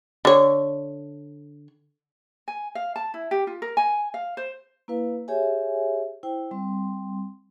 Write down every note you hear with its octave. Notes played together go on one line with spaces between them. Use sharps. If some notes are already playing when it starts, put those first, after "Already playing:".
D3 C#5
G#5
F5
A5
E4
G4
F4
A#4
G#5
F5
C5
A#3 E4 B4 F5
G4 G#4 C#5 E5 G#5
E4 C5 G5
G3 C4 C6